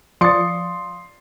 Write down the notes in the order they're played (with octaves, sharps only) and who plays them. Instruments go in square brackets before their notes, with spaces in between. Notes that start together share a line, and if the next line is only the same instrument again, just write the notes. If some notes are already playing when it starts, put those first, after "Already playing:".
[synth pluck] F3 D5 C#7 [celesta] F5 D6 D#6 [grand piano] C6 A6